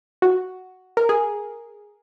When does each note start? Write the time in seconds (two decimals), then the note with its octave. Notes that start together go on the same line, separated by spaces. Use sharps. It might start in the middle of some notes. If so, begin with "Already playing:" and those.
0.22 F#4
0.97 A#4
1.09 G#4